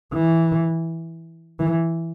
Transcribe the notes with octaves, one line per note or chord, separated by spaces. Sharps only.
E3
E3